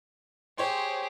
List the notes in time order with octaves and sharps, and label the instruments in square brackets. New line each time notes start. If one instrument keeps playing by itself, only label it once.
[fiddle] G4 G#4 [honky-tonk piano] C5 C#5 C6